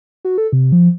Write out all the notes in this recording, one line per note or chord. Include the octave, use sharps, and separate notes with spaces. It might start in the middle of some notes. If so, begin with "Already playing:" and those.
F#4
A4
C3
F3